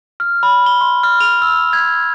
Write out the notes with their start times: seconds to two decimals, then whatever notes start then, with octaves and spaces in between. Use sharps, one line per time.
0.20 F6
0.43 B5
0.66 G7
0.81 C6
1.03 F6
1.21 F7
1.42 E6
1.73 G#6